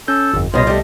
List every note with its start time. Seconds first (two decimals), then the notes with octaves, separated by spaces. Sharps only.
0.08 C#4 A4 G6
0.34 G1 F2
0.54 C2 F#2 B2 F4 D#5 A#6
0.67 G3 A3